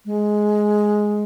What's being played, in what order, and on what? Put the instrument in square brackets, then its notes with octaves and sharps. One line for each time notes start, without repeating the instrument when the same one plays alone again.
[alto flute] G#3